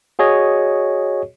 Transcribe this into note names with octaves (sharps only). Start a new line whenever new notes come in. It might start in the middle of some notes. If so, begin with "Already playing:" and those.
F#4 G#4 C#5 D#5